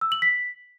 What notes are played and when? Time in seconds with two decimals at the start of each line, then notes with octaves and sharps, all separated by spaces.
0.01 E6
0.12 F#7
0.22 B6